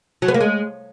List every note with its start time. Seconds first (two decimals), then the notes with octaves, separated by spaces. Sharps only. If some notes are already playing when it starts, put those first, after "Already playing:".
0.22 F#3
0.28 B3
0.34 A#3
0.41 G#3